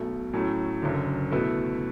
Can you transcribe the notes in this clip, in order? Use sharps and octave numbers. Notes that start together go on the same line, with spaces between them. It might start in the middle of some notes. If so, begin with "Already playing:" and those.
Already playing: B1 B2 A3
A2 F#3 A3 C#4
F#1 F#2 D3
B2 A3 E4 B4